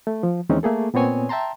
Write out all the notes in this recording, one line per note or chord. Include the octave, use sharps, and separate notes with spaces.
A3
F3
D#2 E3 G#3 C4 C#4 D#4
A3 A#3 G#4 A4
A#2 B3 C4 C#5 G#5
E5 G5 A5 A#5 C6